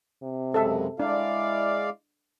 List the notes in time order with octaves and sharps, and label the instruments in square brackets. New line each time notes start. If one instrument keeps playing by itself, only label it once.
[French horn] C3
[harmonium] F#2 C#3 G#3 [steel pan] A4 E5
[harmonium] G#3 D5 F5 [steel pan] D4 [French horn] E4